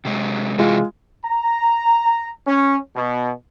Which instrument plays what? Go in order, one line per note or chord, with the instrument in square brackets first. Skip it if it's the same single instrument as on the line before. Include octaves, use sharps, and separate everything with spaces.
[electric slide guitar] C3 F#3 G#3
[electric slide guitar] C3 E3 F#4 [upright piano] G#3 F4
[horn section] A#5
C#4
B2